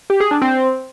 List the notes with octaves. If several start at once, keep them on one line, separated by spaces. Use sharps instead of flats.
G4
G#4
D4
C4